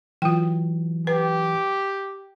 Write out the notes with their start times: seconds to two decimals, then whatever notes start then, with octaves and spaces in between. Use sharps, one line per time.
0.22 E3 F#3 F4 G5
1.07 G4 B4